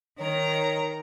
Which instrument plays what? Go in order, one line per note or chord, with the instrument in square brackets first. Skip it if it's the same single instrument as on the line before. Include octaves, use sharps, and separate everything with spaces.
[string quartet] D#3 A#4 A#5 [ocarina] C#5